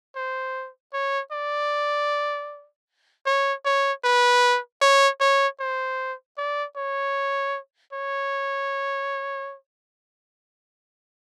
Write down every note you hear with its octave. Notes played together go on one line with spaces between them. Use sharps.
C5
C#5
D5
C#5
C#5
B4
C#5
C#5
C5
D5
C#5
C#5